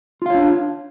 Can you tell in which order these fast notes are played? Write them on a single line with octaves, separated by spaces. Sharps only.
F4 F5 C#5 D4